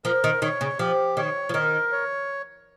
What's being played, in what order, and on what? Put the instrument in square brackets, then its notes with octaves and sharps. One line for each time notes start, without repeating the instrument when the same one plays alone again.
[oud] F3 [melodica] A#4
[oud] D#3
[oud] D#3 [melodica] C#5
[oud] C#3
[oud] F3 [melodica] G4
[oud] D#3 [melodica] C#5
[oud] F3
[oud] D#3 [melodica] A#4
[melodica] C#5